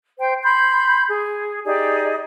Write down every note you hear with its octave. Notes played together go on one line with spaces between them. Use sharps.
C5 G5
B5 C6 G6
G#4
D#4 G4 G#4 D5